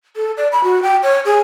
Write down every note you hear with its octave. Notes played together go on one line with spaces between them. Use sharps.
A4
D5
B5
F#4
G5
C#5
G#4